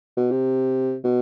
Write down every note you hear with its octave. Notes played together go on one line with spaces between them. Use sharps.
B2
C3
B2